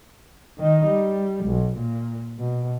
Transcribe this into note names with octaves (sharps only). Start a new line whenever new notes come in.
D#3 D#4
G3
B1
A#2
B2